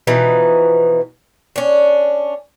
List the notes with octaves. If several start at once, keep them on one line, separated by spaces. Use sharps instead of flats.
B2 E3 F3 D#4
C#4 D4